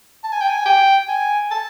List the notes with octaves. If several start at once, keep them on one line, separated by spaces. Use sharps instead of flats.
A5
G#5
G5
G#5
G5
G#5
A5